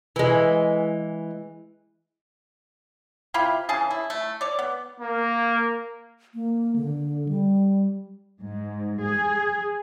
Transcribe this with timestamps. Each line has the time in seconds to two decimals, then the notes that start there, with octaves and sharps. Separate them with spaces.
0.16 E3 G#3
3.34 C3 E4 F4 B5
3.69 C#3 E3 G#4 A5
3.91 E4
4.10 A3
4.41 C#5 D5
4.59 B3
5.00 A#3
6.34 A#3
6.76 D3
7.29 G3
8.40 G#2
9.02 G#4